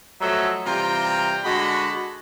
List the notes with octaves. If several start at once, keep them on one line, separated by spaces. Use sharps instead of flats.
F3 F#3 A3 A4 D#5 E5
C3 E3 G3 F4 G5 A#5
D3 G#3 F#4 D#5 A5 B5